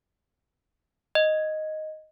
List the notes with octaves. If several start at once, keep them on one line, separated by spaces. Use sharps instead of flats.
D#5